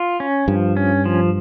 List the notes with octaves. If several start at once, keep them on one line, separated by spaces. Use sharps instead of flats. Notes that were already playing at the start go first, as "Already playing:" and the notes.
Already playing: F4
C#4
G2 F3
C#4
F3